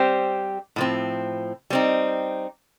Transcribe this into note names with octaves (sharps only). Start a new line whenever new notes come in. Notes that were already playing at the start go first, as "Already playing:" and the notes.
Already playing: G3 C4 G4 C5
A2 F3 C4
G3 C4 D#4